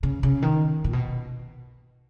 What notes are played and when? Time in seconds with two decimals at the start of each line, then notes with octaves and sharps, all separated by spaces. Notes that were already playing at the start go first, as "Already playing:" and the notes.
0.03 C#3
0.23 C#3
0.42 D#3
0.84 A#2
0.93 B2